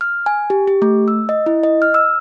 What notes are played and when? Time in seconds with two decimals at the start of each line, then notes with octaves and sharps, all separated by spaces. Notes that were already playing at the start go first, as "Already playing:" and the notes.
0.01 F6
0.26 G#5
0.50 G4
0.67 G4
0.82 A3
1.08 E6
1.29 D#5
1.46 E4
1.63 D#5
1.82 F6
1.94 E6